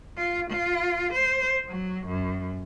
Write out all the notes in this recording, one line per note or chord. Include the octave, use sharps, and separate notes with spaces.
F4
F4
C5
F#3
F#2